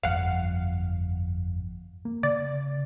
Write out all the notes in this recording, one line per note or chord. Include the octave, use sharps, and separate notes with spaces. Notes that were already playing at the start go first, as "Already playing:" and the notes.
G1 F2 F5 F#5
A#3
C#3 D5